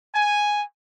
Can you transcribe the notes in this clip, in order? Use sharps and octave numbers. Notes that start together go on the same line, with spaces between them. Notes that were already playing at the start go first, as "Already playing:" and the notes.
G#5